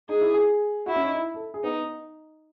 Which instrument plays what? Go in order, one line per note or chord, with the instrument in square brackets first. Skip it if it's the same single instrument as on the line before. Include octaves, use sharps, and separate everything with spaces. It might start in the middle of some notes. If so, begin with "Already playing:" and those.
[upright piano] D#4 [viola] G#4
[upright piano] E4
G#4
[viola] E4 [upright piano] F#4
[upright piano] C#4
D#4
E4
A4
G#4
[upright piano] B3 [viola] D#4
[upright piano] D#4